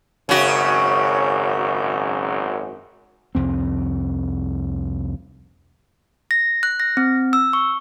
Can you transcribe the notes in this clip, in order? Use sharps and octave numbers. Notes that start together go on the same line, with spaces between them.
G#1 F#2 C#3 F#4
C2 F2 C4
A#6
F#6
A#6
C4
E6
C#6